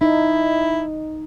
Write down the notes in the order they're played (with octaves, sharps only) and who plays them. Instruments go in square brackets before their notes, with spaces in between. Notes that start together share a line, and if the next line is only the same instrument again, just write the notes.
[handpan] D#4 [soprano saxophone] E4